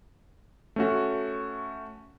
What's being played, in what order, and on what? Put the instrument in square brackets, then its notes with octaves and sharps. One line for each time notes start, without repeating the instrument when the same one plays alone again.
[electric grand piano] A3 C#4 F#4